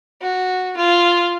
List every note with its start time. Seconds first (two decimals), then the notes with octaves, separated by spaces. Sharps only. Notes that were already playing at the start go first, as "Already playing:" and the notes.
0.22 F#4
0.77 F4